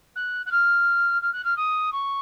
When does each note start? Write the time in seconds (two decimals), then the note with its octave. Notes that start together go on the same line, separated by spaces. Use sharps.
0.16 F#6
0.46 F#6
0.51 F6
1.22 F6
1.33 F#6
1.44 F6
1.56 D#6
1.92 C#6